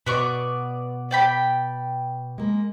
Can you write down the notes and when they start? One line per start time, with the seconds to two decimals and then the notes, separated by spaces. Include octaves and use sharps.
0.06 B2 B3 D5 D#5 C#6
1.11 D5 G5 B5
2.38 G#3 A#3